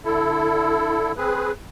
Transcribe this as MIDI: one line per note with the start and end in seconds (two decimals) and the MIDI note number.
0.05 1.12 50
0.05 1.12 64
0.05 1.12 69
1.17 1.52 60
1.17 1.52 68
1.17 1.52 71